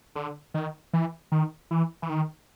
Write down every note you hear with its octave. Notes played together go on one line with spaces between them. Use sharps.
D3
D#3
E3
D#3
E3
E3
D#3